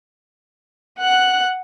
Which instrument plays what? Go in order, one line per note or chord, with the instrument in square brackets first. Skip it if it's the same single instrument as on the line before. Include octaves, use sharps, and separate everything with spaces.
[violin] F#5 F#6